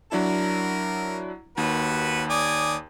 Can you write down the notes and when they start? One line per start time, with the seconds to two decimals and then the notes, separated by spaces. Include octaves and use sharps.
0.12 F#3 D4 E4 A#4
1.58 D#2 F#4 B4
2.30 D5 G#5 D#6